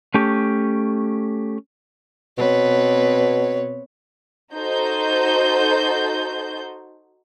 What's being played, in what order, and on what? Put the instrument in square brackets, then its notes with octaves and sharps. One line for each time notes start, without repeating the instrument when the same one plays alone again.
[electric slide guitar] A3 C#4 G4
[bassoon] B2 [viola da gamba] B3 C4 B4 [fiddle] C#5
[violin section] D#4 F#4 A4 C5 G6